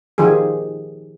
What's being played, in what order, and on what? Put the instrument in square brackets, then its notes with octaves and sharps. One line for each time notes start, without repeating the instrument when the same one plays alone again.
[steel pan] D#3 F3 G4 G#4